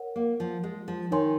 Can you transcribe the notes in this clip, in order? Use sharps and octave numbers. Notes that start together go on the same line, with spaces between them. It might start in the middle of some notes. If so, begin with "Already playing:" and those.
Already playing: A#4 C#5 F#5
A#3
F3
G#3
F3
D#3 D#4 A#4 C#5 G#5 C6